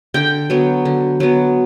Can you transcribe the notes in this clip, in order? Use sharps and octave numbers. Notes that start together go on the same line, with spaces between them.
D3 G5
F#3 B3
D3
F#3 B3